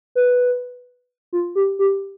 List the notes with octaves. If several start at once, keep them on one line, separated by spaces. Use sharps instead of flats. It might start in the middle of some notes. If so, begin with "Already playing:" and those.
B4
F4
G4
G4